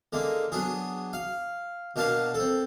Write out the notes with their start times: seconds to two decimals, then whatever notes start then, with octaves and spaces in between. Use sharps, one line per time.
0.13 D3 G#3 A#3
0.52 F#3 B3 D4 G#4
1.13 F5
1.96 B2 A#3 D4 F5 A5
2.34 C4 A4